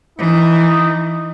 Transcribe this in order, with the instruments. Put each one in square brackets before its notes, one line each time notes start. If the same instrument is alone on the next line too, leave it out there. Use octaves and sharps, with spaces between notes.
[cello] E3 [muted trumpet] D#4